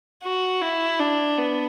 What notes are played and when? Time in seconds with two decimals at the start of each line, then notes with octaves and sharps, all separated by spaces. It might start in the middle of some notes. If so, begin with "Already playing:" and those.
0.23 F#4
0.62 E4
0.99 D4
1.37 B3